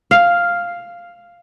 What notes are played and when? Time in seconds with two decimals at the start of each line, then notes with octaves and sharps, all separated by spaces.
0.11 F5